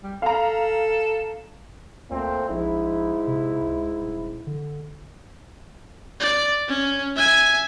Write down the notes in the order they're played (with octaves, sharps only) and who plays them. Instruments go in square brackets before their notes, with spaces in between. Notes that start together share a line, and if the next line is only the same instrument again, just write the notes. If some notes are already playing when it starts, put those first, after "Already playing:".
[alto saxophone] G3
[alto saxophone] A4 [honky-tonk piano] F5 A#5
[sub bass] D2 [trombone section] A#2 A3 C4
[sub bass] A#1 [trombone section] G#2 E4
[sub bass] C3
C#2
D#1
D3
[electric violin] D5
C#4
E5 G#5